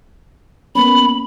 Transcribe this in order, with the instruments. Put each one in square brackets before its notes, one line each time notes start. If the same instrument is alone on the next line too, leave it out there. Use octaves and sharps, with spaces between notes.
[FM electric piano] A#3 B3 C#4 [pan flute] B5